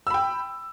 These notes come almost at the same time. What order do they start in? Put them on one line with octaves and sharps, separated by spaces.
E6 B5 G5